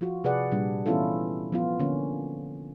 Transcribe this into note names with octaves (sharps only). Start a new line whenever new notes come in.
F3 F4 F#4
C3 G#4 B4 D5 F#5
A#2 G3 D4
E3 B3 C#4 E4 F4 A4
F3 B3 F4
D3 A#3 C#4